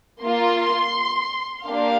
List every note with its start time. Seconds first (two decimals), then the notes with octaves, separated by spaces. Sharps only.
0.23 A#3 F4 C6
1.67 A#3 D4 G4 F5